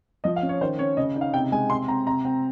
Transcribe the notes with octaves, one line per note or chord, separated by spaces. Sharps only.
F3 D#5
F5
C#4
C#5
D#3 C5
C#4 C#5
C#3 D#5
D#4
F5
C3 G5
G#3 G#5
C3 C6
C4 A#5
C3 A#5
C4